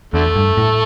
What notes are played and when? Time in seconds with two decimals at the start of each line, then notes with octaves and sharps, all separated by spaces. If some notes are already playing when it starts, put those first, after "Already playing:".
0.13 E2 D3 A3
0.36 G2
0.57 A2